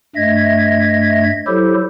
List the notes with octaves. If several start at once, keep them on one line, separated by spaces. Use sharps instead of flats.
G2 A3 D#5 E5 G#6
F#3 E4 G4 A4 C5